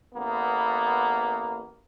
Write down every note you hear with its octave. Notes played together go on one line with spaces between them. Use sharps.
A1 A#3 B3